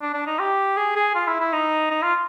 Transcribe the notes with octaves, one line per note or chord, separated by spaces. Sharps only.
D4
D4
D#4
G4
G#4
G#4
F4
E4
E4
D#4
D#4
F4